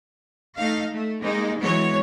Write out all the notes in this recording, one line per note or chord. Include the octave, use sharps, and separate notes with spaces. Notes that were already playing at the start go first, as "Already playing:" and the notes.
A3 D#4 F5
A3
G3 G#3 A#3 D#4
E3 F#3 G#3 B3 C#5